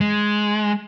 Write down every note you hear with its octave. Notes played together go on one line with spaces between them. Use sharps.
G#3